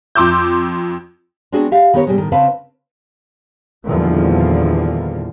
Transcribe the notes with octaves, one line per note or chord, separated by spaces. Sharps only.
F2 C6 D6 E6 G6
G#3 B3 C4 D4 F#4 G#4
G4 E5 F5
D#3 B3 G4 A#4 C#5
B2 G3 G#3
A2 D#3
C#3 C4 B4 F5 A5
E2 A#2 D3 D#3 F3 G3